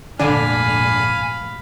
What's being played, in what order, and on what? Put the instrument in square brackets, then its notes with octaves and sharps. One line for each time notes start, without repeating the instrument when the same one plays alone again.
[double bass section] F1 A#1 G#2 [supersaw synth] D3 D4 [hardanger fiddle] F5 B5 [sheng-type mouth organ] G#5